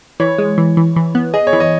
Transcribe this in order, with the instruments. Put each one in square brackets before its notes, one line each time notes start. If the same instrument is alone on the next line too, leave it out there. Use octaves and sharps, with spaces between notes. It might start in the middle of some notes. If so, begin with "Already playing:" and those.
[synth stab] E3 [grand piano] C#5
[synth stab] G#3
E3
E3
E3
B3
[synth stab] G#4 [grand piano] D#5
[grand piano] C#5
[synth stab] E3
[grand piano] D#5